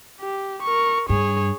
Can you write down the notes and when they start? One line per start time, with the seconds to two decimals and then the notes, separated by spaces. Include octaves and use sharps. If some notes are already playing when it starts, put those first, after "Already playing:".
0.21 G4
0.63 A#4 C#6
1.09 G2 G#4 C#5